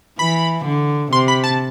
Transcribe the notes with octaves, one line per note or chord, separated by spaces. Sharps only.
E3 B5
D3
C3 C6
B5
A5